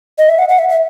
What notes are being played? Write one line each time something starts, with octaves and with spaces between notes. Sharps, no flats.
D#5
E5
F#5
F#5
E5
E5